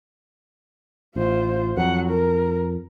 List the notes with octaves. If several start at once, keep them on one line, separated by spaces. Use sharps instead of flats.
A1 F4 C5
F2 F#3 F#5
A#4